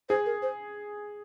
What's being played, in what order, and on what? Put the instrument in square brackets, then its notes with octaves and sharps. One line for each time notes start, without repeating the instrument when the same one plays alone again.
[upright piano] G#4 [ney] C5
[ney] A#4
C5